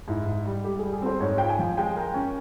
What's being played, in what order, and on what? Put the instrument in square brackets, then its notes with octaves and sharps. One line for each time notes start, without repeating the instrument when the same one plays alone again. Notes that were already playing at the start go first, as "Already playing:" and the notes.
[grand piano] G#2 [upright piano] E4
[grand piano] G#2
G3
[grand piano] G3 [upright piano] G4
[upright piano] G#4
[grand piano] G3
[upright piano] G#4
[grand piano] C4 [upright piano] C5
[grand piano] G#2 [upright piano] C#5
[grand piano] F4 [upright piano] G5
[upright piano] G#5
[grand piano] F3
[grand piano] G#3 [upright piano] G5
[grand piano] A#4
C#4